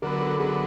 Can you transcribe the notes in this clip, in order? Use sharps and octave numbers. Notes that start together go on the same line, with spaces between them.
D3 F#3 B3 A#4
A4
D3 F#3 B3 G#4